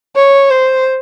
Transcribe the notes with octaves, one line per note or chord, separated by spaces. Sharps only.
C#5
C5